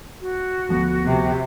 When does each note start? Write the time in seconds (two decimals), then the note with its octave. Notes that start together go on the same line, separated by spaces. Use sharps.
0.21 F#4
0.69 D2 F3 B3
1.05 C3